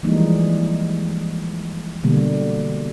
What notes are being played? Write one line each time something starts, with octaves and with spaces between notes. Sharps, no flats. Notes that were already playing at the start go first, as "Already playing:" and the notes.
E3 F3 G3 G#3 A#3 D#4
B2 D3 G3 A#3